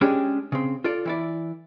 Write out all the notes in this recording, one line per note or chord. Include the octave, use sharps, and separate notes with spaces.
G#3 C#4 D4 G4 G#4
C#3 C4
F4 A4 D5
E3 E4 D5